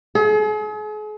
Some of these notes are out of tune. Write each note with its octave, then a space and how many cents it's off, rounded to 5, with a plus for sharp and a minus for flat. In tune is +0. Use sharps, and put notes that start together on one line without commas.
G#4 +40